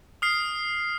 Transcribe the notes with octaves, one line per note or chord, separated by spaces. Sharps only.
D#6 F6 C7